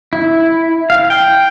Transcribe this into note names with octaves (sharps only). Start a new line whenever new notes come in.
E4
F5
G5